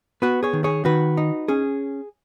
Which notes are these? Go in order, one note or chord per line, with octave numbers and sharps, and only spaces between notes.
B3 F#4 B4
G#4 C#5
D#3
G#4 C#5
D#3 F#4 B4
D#4
C#4 G#4